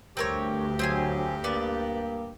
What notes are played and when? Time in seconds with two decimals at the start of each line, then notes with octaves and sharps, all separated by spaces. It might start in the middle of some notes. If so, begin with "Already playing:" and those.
0.17 D2 G2 C4 G4 A#4 C#5
0.79 F#3 C4 G#4 G#5
1.44 A#3 B3 D5